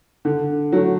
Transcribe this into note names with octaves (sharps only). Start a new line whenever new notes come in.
D3
F#3 A3